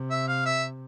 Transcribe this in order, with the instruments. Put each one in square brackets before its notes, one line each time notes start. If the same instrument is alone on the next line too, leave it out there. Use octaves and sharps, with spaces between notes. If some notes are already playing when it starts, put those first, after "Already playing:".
Already playing: [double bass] C3
[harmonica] E5
F5
E5